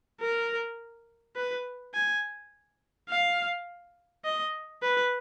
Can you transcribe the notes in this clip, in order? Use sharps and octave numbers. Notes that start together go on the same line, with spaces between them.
A#4
B4
G#5
F5
D#5
B4